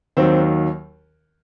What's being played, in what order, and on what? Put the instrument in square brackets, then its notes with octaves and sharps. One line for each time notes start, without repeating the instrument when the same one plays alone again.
[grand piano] D#2 D#3 F#3 C4